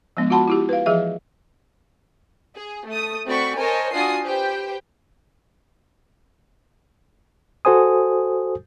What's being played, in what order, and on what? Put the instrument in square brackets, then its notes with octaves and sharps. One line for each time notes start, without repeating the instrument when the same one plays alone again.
[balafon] F3 G#3 B3 D4
F4 F#4 F#5 A5 B5 C6
E4 F4 G4
B4 F5
E3 F3 G#4 E5
[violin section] G#4
A3 D#6
A3 C4 F#4 D5 B5 C#6
A#4 C5 C#5 D#5 G#5 A5
D4 F4 F#4 G#5 D#6 C7
G4 B4 C5 G5
[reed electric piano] F#4 A4 C5 G#5 D#6